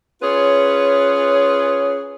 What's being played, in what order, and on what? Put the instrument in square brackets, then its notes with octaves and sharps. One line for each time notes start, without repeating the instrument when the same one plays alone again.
[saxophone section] C#4 F4 G#4 B4 C#5